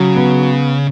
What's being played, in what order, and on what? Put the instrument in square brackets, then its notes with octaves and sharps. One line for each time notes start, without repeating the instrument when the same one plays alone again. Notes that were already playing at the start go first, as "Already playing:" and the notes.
Already playing: [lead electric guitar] C#3 [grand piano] F#3
[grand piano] B3